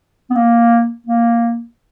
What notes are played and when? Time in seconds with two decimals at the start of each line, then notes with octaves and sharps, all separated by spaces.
0.30 B3
0.35 A#3
1.07 A#3